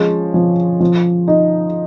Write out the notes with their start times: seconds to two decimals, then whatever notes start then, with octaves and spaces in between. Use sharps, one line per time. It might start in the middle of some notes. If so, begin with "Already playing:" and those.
Already playing: F3 G#3 C#4
0.34 F3
0.80 F3
1.28 D#4